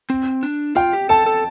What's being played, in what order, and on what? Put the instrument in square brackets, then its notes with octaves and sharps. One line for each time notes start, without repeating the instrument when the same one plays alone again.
[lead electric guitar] C4
D4
[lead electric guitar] F4 [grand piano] G5
[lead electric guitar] G4
[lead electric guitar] A4 [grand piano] A5
[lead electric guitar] A4